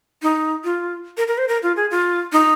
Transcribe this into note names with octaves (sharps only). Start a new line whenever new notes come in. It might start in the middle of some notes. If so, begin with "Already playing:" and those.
D#4
F4
A#4
A#4
C5
A#4
F4
G#4
F4
D#4